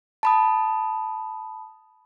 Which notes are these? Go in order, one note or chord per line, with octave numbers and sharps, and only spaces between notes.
A5 B5 D#6